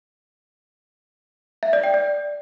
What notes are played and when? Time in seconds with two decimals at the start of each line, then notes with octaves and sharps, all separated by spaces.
1.63 E5
1.73 D5
1.84 G5
1.94 D5